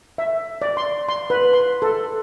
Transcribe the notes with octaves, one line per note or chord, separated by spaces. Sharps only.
E5
D5
C6
C6
B4
C6
A4